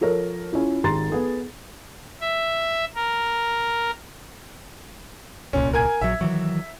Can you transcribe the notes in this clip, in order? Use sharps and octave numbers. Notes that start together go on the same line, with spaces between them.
F3 A4 A#4 C#5
C#4 E4 F4
G#1 G4 A#5 C6 A6
B3 G#4 A4
E5
A#4
D1 C2 A#2 C#4
A#4 G#5 G#6
A#1 F#3 E5
D#3 E3 F#3